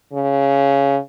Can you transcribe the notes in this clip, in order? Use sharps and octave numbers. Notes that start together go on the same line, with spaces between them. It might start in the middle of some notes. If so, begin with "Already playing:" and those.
C#3